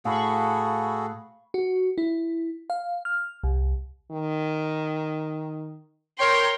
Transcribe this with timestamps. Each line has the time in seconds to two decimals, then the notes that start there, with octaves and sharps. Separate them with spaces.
0.05 A2 F#4 G#4 A4 F5 B5 C#6
1.54 F#4
1.98 E4
2.70 F5
3.05 F6
3.44 C2
4.11 D#3
6.19 A#4 C#5 G5 C6